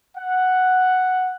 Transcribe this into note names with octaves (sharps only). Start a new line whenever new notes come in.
F#5